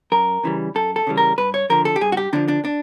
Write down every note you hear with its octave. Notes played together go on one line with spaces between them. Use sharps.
F#2 A#4
C#3 E3 G3
F#2 A4
A4
C#3 E3 G3
A#4
G2 B4
C#5
D3 F3 A#4
A4
G4
G2 G#4
F#4
G4
D3 F3 D4
D4
D4